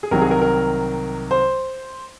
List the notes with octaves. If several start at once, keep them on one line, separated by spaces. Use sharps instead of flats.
G#4
C2 C3 D#3 F#3 A#4
G#4
A#4
A#4
C5